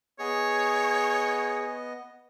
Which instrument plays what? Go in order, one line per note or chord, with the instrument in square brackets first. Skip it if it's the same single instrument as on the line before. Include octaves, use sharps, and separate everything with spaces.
[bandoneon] B3 D#5 [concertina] G#4 [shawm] C#5